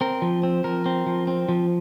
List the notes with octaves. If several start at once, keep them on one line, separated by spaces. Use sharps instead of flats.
C4 A#4
F3
C4
F3 A#4
C4
F3
C4
F3